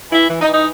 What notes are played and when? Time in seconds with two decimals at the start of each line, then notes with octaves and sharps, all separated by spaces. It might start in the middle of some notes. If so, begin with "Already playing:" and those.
0.11 E3 E4
0.30 E3
0.42 D#4
0.48 E3
0.54 D#4